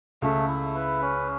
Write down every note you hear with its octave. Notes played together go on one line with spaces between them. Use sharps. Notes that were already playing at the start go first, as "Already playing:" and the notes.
C#2 C#3 A3
E4
B4
C#4